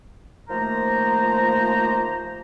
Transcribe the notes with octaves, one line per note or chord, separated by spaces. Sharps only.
D#2 F3 A3 A#3 C5 A#5